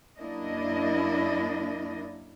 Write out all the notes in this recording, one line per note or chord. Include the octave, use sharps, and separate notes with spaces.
F#2 A#3 D4 E4 D#5